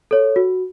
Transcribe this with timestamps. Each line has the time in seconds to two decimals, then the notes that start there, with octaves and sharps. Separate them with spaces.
0.11 A4 C#5
0.36 F#4